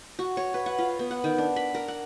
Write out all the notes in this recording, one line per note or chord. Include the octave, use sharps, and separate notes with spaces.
F#4
C#5
B4
F#5
F4
B3
F#5
D#3
D4
B5
A#4
F#5